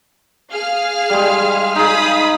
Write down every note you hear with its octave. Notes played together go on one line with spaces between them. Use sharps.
G#4 F5 F6
G3 G#3
D#4 G#4 F5 B5 D#6